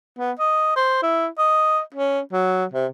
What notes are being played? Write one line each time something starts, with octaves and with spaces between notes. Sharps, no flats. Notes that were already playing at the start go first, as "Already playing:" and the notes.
B3
D#5
C5
E4
D#5
C#4
F#3
C3